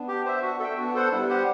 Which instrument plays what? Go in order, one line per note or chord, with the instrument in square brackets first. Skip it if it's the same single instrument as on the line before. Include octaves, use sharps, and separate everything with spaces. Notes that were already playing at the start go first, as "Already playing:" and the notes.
Already playing: [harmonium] B3 D4
[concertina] G4
C5 E5
F#4
A4 E5 G5
[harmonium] B3 D4 [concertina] F#4
[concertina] A4 C5 F#5
[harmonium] G3 B3 [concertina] E4
[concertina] G4 C5 F#5